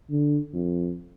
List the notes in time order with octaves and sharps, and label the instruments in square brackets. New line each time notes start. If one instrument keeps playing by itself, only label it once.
[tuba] D3
F2